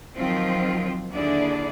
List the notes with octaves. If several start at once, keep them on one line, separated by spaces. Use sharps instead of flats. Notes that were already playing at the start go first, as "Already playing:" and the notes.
D#3 F3 F#3 C4 F4
D#2 D3 D4 E4 G#4 D5